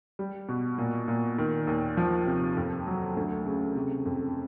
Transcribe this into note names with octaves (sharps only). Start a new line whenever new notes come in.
G3
B2
A#2
A#2
D#3
D#2
F3
C3
F2
F#3
D2
C#3
C3
F2